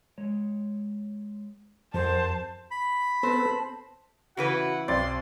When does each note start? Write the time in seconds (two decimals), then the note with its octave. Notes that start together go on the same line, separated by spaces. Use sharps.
0.18 G#3 C#5
1.94 F2 G4 A#4 C5 F#5 A5
2.71 B5
3.23 B3 C4 A4 B4 C5 A5
4.37 C#3 E3 F#4 B4 F#5
4.88 B1 C4 D5 C6 A6